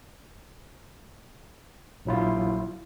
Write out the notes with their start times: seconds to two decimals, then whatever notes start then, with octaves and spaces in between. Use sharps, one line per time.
2.05 A#1 F#3 E4 F4